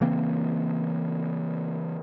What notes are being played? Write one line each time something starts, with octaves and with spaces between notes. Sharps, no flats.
C#3 E3 A#3 C4